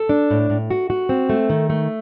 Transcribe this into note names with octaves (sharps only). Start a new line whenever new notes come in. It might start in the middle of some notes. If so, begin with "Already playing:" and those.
Already playing: A4
D4
A2
A2
F#4
F#4
C4
A3
D#3
A3